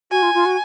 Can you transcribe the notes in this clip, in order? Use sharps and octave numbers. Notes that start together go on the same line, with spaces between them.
F#4 G#5
F4
F4
F#4